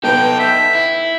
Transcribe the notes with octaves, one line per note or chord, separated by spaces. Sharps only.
B3 D#4 A4 B4 G5
E5
E4